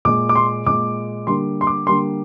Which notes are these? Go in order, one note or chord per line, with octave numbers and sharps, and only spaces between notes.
A#2 G#3 D6
D6
C6
A#2 G#3 D6
D3 G3 A#3 C6
C6
D6
D3 G3 A#3 C6